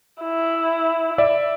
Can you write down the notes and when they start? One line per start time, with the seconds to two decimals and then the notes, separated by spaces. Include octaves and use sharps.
0.23 E4
1.18 D5 E5